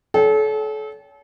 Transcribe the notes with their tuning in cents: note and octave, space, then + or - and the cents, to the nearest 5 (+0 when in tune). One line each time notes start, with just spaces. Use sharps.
A4 -35 C#5 +35 G5 +5